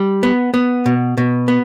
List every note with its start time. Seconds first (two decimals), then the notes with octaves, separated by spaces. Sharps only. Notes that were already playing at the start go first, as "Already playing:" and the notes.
Already playing: G3
0.23 B3
0.54 B3
0.86 B2
1.17 B2
1.48 B3